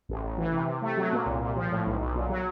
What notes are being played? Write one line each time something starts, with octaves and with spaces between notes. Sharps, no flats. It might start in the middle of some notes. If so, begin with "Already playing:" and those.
A1
A1
E3
C3
C3
A3
F#3
A#2
C2
A#2
F3
A2
B1
B1
A#2
F#3